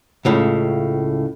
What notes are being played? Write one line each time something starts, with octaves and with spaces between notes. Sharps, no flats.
C#2 A2 C#3